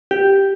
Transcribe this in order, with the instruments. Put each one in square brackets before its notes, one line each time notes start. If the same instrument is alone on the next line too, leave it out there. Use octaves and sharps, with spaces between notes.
[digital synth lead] G4